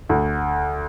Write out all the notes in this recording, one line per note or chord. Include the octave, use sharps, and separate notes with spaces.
D2